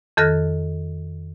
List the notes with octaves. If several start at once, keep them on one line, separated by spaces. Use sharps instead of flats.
F2 D#3 A4 F6 F#6 A#6